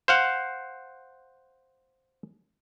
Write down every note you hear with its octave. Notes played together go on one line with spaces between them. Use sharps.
C5 F5 F#5